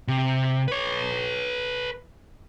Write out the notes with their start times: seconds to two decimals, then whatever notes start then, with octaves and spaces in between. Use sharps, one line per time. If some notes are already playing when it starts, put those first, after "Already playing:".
0.08 C3
0.68 B4 C#5